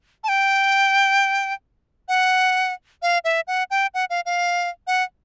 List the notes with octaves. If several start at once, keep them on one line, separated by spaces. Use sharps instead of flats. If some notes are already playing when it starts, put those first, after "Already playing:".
A5
G5
F#5
F5
E5
F#5
G5
F#5
F5
F5
F#5